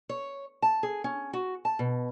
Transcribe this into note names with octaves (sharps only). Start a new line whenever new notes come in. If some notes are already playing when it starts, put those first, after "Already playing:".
C#5
A5
G#4
C#4
F#4
A5
B2